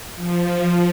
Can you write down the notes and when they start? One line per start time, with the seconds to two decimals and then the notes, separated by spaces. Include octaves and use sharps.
0.16 F3